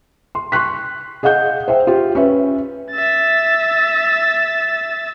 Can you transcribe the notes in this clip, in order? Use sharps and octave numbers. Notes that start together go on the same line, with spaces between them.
C6
C6 C#6 F#6 B6
G#4 D#5 F5 F#5 G6
C5 E5 G5
F4 G4
C#4 B4 E5
E5 A6